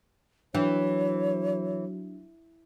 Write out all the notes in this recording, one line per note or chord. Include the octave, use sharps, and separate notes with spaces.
E3 F#3 D4 C#5